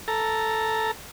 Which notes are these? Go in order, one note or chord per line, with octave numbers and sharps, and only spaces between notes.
A4 A#5